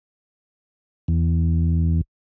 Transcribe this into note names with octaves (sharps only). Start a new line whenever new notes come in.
E2